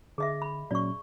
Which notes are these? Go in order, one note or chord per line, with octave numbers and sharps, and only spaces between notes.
D3 G#4 D#5 E5
B5
A#2 F#3 C#4 D5 C#6